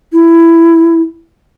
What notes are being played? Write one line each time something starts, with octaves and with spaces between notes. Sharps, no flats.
E4